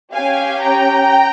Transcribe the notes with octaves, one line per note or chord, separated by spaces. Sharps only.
C#4 G4 F5 G#5
G5 A#5